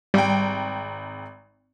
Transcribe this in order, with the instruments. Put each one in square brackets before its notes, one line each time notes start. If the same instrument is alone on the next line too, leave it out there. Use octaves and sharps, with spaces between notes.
[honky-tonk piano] G#1 G5 [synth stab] G3